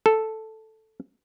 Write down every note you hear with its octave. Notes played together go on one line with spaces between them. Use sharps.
A4